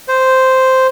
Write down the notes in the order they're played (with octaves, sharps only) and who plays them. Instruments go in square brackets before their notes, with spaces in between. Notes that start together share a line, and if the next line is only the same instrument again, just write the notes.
[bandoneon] C5